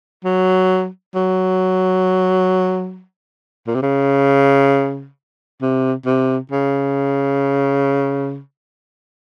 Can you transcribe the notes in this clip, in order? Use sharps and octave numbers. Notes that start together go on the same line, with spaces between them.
F#3
F#3
A#2
C3
C#3
C3
C3
C#3